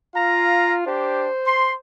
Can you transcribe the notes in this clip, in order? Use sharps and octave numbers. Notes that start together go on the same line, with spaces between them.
F4 F5 A#5
D4 G4 C5
C6